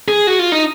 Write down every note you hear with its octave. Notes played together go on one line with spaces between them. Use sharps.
G#4
F#4
F4
D#4